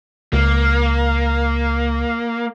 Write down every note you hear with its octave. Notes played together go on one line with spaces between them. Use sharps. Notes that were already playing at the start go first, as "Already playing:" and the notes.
C#2 A#3